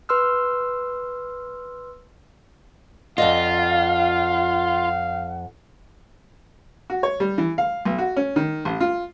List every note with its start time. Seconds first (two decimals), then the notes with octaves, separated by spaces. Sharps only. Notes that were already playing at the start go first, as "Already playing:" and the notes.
0.09 B4 C6 E6 F6
3.18 F2 F4 D5 D#5 F5 F#5
6.90 F#4
7.03 C#5
7.20 G3
7.38 E3
7.58 F5
7.85 B1
7.98 F#4
8.16 C#4
8.36 D#3
8.65 A1
8.80 F4